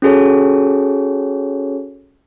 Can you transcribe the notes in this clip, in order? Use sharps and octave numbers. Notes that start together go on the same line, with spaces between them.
C#4 F#4 G#4 A4 C#5